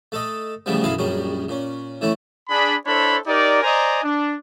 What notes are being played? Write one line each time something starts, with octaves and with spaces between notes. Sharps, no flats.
A3 A4 D#5
A2 C#3 E3 F3 G3 B3
B1 F#2 E3 G#4 F5 B5
A#1 F#2 G3 C#4 G#4
A#2 C#4
E3 A3 C#4 E4
D4 G#4 B5
D4 E4 A4 C5 C#5 B5
D#4 G4 A#4 D5
C5 D5 D#5 G#5 A#5
D4